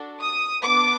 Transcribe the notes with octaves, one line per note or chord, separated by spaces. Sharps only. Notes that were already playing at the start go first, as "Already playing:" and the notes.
Already playing: D4 F#4 A4
D#6
B3 D4 D6